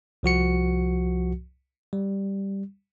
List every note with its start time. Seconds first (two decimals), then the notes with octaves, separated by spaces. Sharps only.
0.23 C2 F3 F#4 C#7
1.93 G3